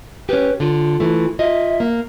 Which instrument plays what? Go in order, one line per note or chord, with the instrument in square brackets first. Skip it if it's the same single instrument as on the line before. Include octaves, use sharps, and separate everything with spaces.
[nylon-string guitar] C#4 G4 [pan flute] B4
[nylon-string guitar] D3 [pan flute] F4
[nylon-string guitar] E3 A3
[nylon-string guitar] F4 D#5 [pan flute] E5
[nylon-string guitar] A#3